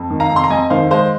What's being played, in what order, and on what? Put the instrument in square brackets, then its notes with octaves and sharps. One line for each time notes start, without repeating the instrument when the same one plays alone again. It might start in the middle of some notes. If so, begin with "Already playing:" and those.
Already playing: [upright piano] F2
D#3
F5 A#5
F2
C6
A#5
F2 D#5 G#5
D#3 C5 F5
G#3 C5 F5